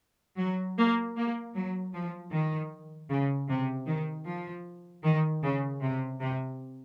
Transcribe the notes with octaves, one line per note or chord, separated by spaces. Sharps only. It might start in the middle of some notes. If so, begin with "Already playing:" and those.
F#3
A#3
A#3
F#3
F3
D#3
C#3
C3
D#3
F3
D#3
C#3
C3
C3